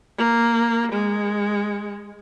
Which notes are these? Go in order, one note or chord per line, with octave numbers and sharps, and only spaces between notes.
A#3
G#3